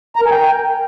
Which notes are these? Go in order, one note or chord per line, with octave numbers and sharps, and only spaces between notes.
A#5
A#4
G#5
G5